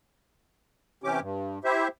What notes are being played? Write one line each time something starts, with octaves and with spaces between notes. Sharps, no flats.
C3 E3 C#4 G4 D6
G2
E4 G4 C5 E5